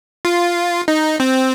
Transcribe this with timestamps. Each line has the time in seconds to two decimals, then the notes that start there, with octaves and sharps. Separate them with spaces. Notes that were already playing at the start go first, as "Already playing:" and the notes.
0.25 F4
0.88 D#4
1.20 C4